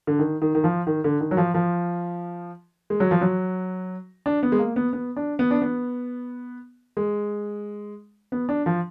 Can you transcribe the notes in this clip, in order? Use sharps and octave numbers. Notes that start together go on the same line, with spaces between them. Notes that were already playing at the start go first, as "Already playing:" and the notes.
D3
D#3
D#3
D#3
F3
D#3
D3
D#3
F#3
F3
F3
G#3
F#3
F3
F#3
D4
B3
G#3
A#3
B3
B3
D4
B3
D4
B3
G#3
B3
D4
F3